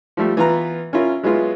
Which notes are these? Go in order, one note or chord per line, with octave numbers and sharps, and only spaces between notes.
F3 G3 A3
E3 B3 F4 B4 A#5
C#4 E4 F4 A#4
F#3 G#3 B3 E4 F4